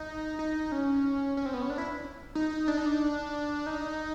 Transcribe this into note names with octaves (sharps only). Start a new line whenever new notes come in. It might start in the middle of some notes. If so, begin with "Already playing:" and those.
Already playing: D#4
D#4
C#4
C#4
C4
B3
C#4
D4
E4
D#4
D4
D#4
D4
D#4